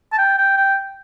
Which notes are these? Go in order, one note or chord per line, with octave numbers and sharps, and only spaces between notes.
A5
G5
G5
G5